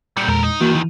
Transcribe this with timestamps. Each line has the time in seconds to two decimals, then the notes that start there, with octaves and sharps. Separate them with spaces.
0.17 A#2 G3 G6 C#7
0.28 E2 A#2 G#3 A4 A#4
0.43 D#4
0.61 E2 D#3 E3 A#3 F#4
0.75 E3